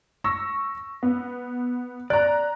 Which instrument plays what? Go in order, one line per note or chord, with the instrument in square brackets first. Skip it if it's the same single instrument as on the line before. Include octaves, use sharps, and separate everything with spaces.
[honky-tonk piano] C#6 E6 A#6
B3
[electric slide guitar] D5 [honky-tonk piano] A#5 F#6